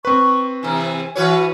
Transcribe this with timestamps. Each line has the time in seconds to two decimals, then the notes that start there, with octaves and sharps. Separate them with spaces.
0.05 C4 B4 C#6
0.63 C3 E3 G#5
1.15 E3 F#4 B4 C#5